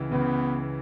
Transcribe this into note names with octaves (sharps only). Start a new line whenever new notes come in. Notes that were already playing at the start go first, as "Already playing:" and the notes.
Already playing: C#2 C#3 E3
C#2 C#3 E3 B3